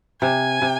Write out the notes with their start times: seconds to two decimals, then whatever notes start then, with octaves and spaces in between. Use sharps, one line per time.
0.22 C3 G#5
0.62 C3